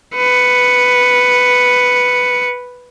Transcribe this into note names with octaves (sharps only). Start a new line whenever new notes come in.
B4 C#7